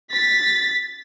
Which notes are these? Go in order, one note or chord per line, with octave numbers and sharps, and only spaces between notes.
A6 B6